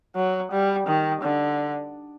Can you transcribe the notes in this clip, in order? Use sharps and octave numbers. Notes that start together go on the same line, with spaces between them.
F#3
G3
D#3
D3